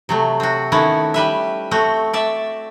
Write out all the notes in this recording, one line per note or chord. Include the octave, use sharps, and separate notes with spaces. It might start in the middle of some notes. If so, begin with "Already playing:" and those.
C3 F#3 A3
C4 F#4
D#3 A3 B3 C#4 E4 F#5
G3 B4 E5
A3 C4 F#4
D5 E5 A5